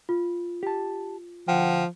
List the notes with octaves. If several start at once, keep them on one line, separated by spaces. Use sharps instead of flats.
F4
G4 A5
D2 F3 F#5 G5